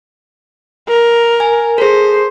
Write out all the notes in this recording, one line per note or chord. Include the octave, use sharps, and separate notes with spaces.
A#4
G#5
G#4 A4 C5